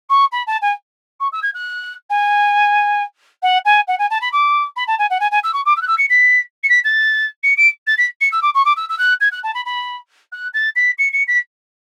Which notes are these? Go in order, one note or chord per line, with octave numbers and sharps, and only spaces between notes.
C#6
B5
A5
G#5
C#6
E6
G#6
F#6
G#5
F#5
G#5
F#5
G#5
A5
B5
D6
B5
A5
G#5
F#5
G#5
G#5
E6
C#6
D6
E6
F#6
E6
C#7
B6
C#7
B6
A6
C#7
D7
A6
B6
C#7
E6
D6
C#6
D6
E6
E6
F#6
G#6
F#6
A5
B5
B5
F#6
A6
B6
C#7
C#7
B6